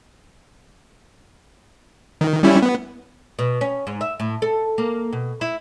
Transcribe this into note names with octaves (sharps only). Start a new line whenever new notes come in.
D#3
G3 C#4 E4
B3
B2
C#4
G#2
E5
A2
A4
A#3
B2
E4